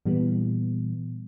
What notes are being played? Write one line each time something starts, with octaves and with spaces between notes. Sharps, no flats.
A#2 E3 G3 B3